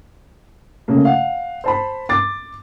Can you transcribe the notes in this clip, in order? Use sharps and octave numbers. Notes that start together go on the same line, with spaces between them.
C#3 A3 A#3
F5 F#5
C5 A5 B5
D6 A6